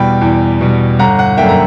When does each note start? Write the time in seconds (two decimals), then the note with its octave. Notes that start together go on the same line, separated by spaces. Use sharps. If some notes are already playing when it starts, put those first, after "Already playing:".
Already playing: E2 B2 G3 G5 B5
0.21 E2
0.61 B2 G3
0.99 G1 F#5 A#5
1.19 F#5
1.37 F#2 D3 A#3 E5 G5
1.49 A#5